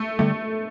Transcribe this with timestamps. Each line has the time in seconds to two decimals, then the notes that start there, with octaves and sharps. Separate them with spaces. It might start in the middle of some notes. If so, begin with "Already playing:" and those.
Already playing: A3
0.19 D3 G3 A3